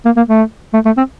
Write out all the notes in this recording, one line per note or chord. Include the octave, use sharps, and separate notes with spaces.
A#3
A#3
A3
A3
A3
C4